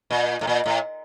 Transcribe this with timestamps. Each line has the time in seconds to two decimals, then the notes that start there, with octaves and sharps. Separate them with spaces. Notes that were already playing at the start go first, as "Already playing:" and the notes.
0.11 A#2
0.41 A2
0.47 A#2
0.66 A2